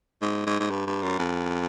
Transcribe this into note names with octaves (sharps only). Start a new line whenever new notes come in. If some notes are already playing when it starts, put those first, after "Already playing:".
G#2
G#2
G#2
G2
G2
F#2
F2